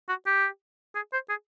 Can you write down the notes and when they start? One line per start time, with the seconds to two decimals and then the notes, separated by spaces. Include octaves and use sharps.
0.09 F#4
0.26 G4
0.95 G#4
1.13 C5
1.29 G#4